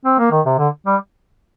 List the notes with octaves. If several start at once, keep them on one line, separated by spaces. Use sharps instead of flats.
C4
A#3
D#3
C3
D3
G3